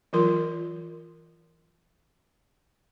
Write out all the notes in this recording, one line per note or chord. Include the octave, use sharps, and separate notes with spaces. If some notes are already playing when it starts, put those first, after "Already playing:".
E3 F#3 F4 A#4 C6